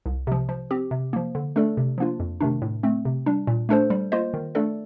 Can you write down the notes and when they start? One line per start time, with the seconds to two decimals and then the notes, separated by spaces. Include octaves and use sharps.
0.06 C2
0.27 C3 F3
0.49 F3
0.71 C4 G4
0.91 C3
1.13 F3 A#3
1.35 D3
1.56 A3 D4 A4 D5
1.77 C3
1.98 F3 A#3 D4 F4
2.20 F2
2.41 C3 D#3 A3 D4
2.62 A2
2.83 A3 C4
3.05 C3
3.26 G3 D4
3.47 A#2
3.69 A3 D4 A4 C5
3.90 G3
4.12 A#3 F4 C5 D#5
4.34 D#3
4.55 A3 D4 A4 D5